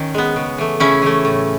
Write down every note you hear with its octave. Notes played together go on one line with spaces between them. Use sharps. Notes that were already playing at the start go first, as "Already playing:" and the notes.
Already playing: D#3 C#4
G#3 B3
C#3
E3 A3
C#3 C#4 E4
E3 A3
A2